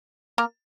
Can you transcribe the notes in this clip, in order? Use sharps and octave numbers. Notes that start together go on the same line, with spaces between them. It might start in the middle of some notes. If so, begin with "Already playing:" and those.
A#3 A#4